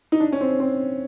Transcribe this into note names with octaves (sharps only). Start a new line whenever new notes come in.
D#4
D4
C#4
C4
C4